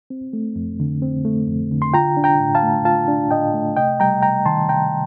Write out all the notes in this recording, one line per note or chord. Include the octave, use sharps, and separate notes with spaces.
C4
A3
F2
D3
C4
A3
F2
D3
C6
F4 G5 A#5
D4
G5 A#5
A2
F5 A5
A3
F4 F5 A5
D4
A2 D#5 G5
A3
C3 D#5 G5
G3 G5 A#5
C3 G5 A#5
D#3 A5 C6
C3 G5 A#5